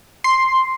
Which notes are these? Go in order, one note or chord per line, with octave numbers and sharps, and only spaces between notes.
C6